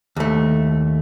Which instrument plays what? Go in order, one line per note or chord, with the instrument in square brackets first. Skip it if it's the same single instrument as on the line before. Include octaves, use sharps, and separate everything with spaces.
[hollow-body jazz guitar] D#2 A3